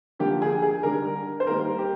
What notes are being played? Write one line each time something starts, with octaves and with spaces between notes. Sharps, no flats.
D3 F3 A#3 G4
G#4
G#4
D3 G3 D4 A#4
C5
D#3 G3 A#3 D#4 A#4
G4